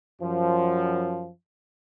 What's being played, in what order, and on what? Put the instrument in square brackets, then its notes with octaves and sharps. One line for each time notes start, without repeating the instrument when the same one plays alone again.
[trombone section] F#2 F3